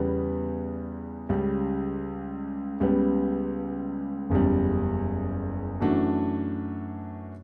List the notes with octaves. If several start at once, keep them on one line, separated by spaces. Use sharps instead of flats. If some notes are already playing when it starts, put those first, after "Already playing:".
Already playing: E2 C#3 G3 B3
C#2 C#3 G3
C#2 C#3 G3 B3
F#1 E2 C#3 G3
F#2 E3 A3 D4 F#4